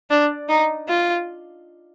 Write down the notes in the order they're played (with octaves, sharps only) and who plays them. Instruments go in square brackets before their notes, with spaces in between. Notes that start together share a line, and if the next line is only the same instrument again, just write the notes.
[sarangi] D4
D#4
F4